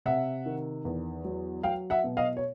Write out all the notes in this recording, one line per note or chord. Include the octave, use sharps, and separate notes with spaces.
C3 E5 F#5
D#3
E2
F#3
F#3 F5 G5
E5 F#5
B2
D#5 F5
C#5